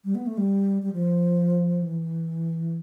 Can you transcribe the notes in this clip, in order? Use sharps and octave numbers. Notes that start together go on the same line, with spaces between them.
G3
B3
A3
G3
G3
F3
E3